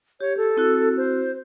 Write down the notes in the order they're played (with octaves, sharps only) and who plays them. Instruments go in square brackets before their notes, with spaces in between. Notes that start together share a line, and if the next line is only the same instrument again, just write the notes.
[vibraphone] G4 [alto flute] C#5
[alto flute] A4
[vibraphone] C4 E4 F#4
[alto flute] C5